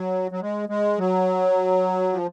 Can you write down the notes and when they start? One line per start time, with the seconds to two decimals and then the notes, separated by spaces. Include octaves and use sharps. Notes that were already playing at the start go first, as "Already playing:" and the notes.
Already playing: F#3
0.31 F#3
0.41 G#3
0.69 G#3
0.98 F#3
2.12 F3